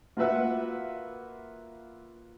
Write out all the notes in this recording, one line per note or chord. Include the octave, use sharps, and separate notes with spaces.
A#3 F4 F#4 B4 E5 F#5